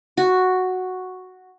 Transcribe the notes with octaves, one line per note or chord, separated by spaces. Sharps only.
F#4